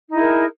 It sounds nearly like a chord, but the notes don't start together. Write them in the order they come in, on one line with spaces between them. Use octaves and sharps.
D#4 E4 G#4 A#4